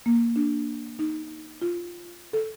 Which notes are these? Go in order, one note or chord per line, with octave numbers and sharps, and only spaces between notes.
A#3
D4
D#4
F4
A4